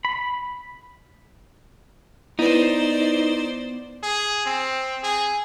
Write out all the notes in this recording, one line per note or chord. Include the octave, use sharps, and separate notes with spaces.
B5
B3 D#4 E4 B4 C5 D5
G#4
C4
G#4